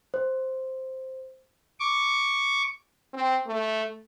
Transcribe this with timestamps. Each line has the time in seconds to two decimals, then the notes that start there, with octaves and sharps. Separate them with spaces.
0.14 C5
1.80 C#6 D6
3.14 C4
3.47 A3